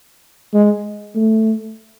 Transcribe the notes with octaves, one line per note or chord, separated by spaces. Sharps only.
G#3
A3